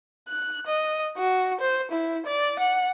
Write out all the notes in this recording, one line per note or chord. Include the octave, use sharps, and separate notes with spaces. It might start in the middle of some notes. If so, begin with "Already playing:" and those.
F#6
D#5
F#4
C5
E4
D5
F#5